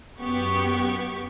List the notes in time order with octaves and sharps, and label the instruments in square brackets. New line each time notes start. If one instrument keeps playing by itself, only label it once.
[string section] F#2 B3 G4 C#6